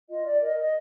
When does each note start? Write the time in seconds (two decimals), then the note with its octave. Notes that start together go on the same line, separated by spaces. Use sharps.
0.09 F4 D#5
0.25 D5
0.41 A#4 D#5
0.57 D#5